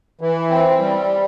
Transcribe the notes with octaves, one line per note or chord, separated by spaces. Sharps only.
E3
C4
G3